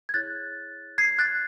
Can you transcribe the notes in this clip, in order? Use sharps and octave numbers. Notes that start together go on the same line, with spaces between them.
G#6
E4 G#4 C#5 F#6 A6
G#6 C7
F#6 A6